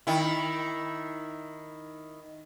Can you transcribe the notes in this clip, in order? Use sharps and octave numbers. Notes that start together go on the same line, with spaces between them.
D#3 E4